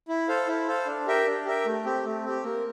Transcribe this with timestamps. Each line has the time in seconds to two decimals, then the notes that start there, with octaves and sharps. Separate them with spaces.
0.08 E4
0.28 A4 C5 F5
0.48 E4
0.68 A4 C5 F5
0.87 D4
1.07 G4 A#4 E5 G5
1.27 D4
1.46 G4 A#4 E5 G5
1.66 A3
1.85 C4 G4
2.05 A3
2.24 C4 G4
2.44 A#3